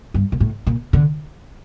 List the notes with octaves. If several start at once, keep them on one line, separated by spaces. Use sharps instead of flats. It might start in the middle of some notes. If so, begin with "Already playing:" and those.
G2
A#2
A2
A#2
D3